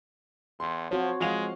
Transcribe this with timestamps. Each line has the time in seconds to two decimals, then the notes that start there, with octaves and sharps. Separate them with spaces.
0.60 E2 C6
0.91 F3 C4 F#4 C#5
1.20 F3 G#3 F5 F7